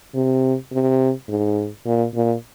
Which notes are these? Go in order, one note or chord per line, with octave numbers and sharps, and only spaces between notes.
C3
C3
G#2
A#2
A#2